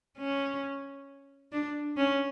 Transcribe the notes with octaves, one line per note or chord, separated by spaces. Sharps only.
C#4
D4
C#4